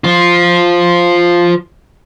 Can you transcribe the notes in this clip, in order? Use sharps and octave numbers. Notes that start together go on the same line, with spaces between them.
F3 F4